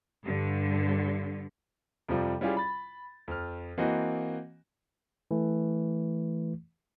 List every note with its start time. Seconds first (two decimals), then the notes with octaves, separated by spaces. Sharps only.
0.24 G2 D3
2.08 F2 C3 F3 G3
2.41 G3 C#4 E4 F4 G4 G#4
2.57 B5 A6
3.28 F2 F6
3.78 E3 A#3 C4 F#4 D#5
5.31 E3 A3